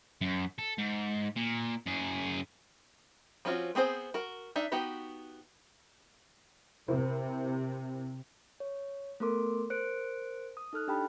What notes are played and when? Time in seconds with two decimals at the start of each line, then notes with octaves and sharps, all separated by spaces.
0.21 F#2
0.59 A4
0.78 G#2
1.36 A#2
1.86 F#2 G#4
3.45 F3 C4 C#4 F4 F#4
3.75 B3 C4 G#4 C5
4.14 F#4 A#4
4.56 D4 D#4 E5
4.72 B3 D#4 F#4 G4 B4
6.88 C3 E4 A#4 C5
8.60 C#5
9.20 A3 B3 A4 A#4 C6 D6
9.70 A#4 C5 F#6 C#7 D7
10.57 D#6
10.73 D#4 A4 F6 F#6
10.88 D4 G4 G5 A5 B5